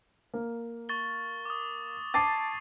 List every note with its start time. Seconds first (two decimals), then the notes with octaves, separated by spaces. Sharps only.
0.34 A#3
0.89 C#6 A6 G7
1.45 D6 D#6
2.14 A5 D6 G#6 A6 C7 D#7